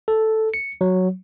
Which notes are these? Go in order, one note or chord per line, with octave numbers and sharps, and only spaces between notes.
A4
C#7
F#3